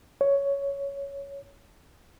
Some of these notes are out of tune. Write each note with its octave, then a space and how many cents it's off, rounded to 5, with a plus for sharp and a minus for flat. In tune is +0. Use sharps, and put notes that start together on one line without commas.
C#5 +10